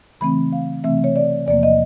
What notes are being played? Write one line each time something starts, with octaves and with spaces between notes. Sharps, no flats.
C#3 E3 A3 C4 B5
F5
C3 E3 A3 C4 E5
C#5
D5
E2 C3 F3 A#3 D5
D#5